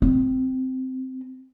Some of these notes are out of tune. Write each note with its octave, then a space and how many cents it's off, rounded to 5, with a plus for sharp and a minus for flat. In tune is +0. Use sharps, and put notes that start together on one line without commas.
C4 -10